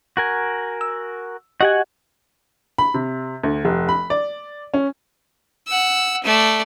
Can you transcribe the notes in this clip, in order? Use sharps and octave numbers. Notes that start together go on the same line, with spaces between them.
F#4 A#4 G#5
E6
F#4 G4 D#5 F#5 G#5
B5
C3
D2
F1
B5
D5
C#4
F#5 E6
A3 D5